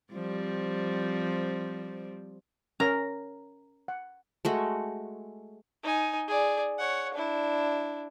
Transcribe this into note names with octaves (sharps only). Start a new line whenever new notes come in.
F3 G3 C4
C#4 A#4 A#5
F#5
G#3 A3 F#4
D#4 G#5
G#4 D5
C#5 F#5
D4 E4